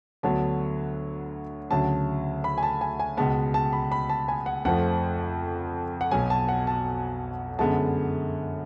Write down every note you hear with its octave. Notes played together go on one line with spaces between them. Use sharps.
D2 D3 F#3 B3 A5
D2 C#3 F#3 A5
B5
G#5
A5
G#5
G#5
C#2 B2 G#3 B3 A5
A5
B5
B5
A5
G#5
F#5
F2 F3 A3 F#5
F#5
B1 B2 F#3 B3 G#5
A5
F#5
A5
F#2 D3 G#3 B3 A5